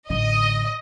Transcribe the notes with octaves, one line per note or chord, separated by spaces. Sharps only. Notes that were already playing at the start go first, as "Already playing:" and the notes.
A1 D3 D#5